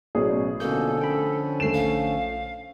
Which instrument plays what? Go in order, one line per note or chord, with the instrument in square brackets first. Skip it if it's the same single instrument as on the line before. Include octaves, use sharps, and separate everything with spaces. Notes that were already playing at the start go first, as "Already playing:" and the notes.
[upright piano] A1 G#4 D5 [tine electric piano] B2 F#3 C#4
[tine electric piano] B2 A#3 G6 [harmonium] D3 F3 C#4 [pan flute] A4
[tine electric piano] G5 B5
[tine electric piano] D#2 C7 [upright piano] A3 E7
[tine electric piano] A#1 [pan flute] F5